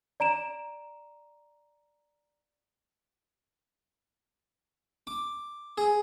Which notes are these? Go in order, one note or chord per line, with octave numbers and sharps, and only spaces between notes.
D5 A#5 D7 E7
D6
G#4